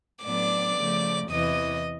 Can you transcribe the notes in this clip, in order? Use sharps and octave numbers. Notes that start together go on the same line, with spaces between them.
A2 F#3 B3 D4 D5 D6
C#3 F3 A3
E2 C3 E3 D#5 D#6